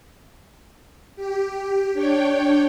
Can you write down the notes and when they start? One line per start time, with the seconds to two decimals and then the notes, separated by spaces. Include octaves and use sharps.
1.16 G4
1.94 D4 C#5 G5